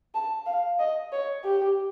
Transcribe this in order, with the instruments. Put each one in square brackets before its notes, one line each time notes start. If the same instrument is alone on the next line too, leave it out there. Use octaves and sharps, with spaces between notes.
[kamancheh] A5
F5
D#5
C#5
G4